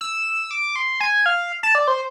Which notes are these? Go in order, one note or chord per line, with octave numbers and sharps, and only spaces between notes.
E6
D6
C6
G#5
F5
A5
D5
C5